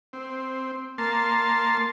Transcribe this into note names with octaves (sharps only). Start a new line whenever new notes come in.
C4
A#3 A5 C6